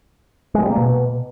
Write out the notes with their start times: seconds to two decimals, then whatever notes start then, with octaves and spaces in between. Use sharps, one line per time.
0.55 G#3
0.62 G3
0.70 A#3
0.77 B2